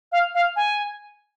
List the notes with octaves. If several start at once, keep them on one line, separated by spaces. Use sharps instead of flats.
F5
F5
G#5